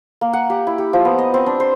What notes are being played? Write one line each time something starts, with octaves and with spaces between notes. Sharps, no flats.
A#3
F#5
G4
E4
G4
F3
B3
D#5
C4
D4
C5